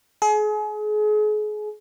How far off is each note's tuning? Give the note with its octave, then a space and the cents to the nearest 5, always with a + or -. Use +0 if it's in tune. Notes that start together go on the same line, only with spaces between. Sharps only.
G#4 +35